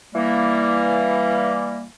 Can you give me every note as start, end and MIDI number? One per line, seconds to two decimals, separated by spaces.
0.14 1.86 52
0.14 1.86 55
0.14 1.86 58